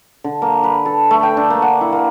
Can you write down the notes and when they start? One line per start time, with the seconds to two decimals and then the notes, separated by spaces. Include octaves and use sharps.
0.24 D3
0.42 A#3
0.64 B4
0.85 A4
1.11 A3
1.23 G5
1.37 D4
1.50 A#3
1.62 F#5
1.81 E4
1.92 A#3